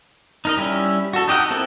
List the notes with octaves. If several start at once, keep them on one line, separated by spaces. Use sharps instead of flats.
D#4 A#4 D#5
G3 C#4 E4
F#4 A4
D#4 G4 D#5 F#5
C4 E4 A4 A#4